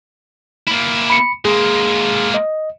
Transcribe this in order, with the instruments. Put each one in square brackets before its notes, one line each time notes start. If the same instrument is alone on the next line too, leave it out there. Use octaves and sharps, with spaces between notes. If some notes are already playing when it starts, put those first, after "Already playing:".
[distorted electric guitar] A#3 E4
[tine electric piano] B5 C#7
[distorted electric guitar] G#3 A#3 [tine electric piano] G#4
[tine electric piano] D#5